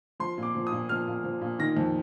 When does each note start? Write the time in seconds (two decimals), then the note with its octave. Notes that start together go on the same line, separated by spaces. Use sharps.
0.20 F3 C6
0.38 A#2 D6
0.55 F3
0.67 D#6
0.72 A#2
0.89 F3 F6
1.08 A#2
1.24 F3
1.41 A#2
1.59 D#3 A#6
1.77 F2